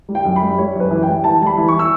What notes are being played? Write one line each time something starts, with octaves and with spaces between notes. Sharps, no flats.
G3
G5
F#2
B5
G3
G3 C#5
F#2 B4
E3
G5
G3
E3 A5
G3 A5
B5
E3
C#6
E6